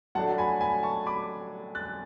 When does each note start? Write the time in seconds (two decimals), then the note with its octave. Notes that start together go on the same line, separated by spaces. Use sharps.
0.15 A2 F#3 A3 D4 F#5 A5
0.38 G#5 B5
0.61 G#5 B5
0.83 A5 C#6
1.06 B5 D6
1.75 F#6 A6